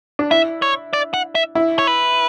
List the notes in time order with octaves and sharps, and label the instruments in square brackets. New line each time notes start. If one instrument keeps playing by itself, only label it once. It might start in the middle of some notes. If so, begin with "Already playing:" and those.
[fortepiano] D4
[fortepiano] E4 [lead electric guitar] E5
[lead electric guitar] C#5
D5
F#5
E5
[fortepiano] E4
[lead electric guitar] C#5
B4